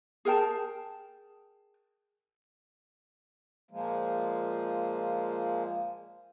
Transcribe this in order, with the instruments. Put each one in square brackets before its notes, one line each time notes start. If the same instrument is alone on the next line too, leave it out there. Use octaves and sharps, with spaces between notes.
[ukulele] G#4 A#4 G5 A5
[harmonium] A#2 F3 G#3 A#3